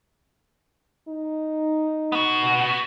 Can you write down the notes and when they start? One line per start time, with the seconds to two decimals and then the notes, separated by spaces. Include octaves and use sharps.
1.08 D#4
2.12 B3 F#4